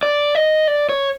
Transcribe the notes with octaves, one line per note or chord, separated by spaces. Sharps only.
D5
D#5
D5
C#5